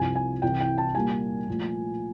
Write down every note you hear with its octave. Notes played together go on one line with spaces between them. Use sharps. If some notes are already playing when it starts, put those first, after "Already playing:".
Already playing: C2 C3 F3 G#5
G#5
C2 C3 E3 G5
G5
A5
A#2 G3 A#3 G#5
A#2 F3 A3